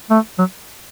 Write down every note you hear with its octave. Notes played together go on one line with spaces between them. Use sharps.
A3
F#3